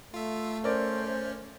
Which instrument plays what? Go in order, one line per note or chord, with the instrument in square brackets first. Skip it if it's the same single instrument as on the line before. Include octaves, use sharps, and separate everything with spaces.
[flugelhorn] A3 [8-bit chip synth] F4 E5
[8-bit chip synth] C#4 [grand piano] A#4 D5 [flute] C5